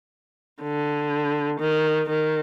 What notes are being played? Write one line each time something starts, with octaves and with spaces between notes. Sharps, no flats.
D3
D#3
D#3